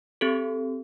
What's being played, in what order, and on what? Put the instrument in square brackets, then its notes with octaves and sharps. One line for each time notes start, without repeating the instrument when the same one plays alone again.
[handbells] C4 G4 A4